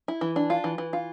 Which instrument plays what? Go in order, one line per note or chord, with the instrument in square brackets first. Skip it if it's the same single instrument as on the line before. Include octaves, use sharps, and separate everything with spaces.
[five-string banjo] E4
E3
D4
F4
E3
E3
F4